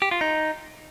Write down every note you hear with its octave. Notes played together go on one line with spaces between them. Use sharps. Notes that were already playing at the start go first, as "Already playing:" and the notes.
G4
F4
D#4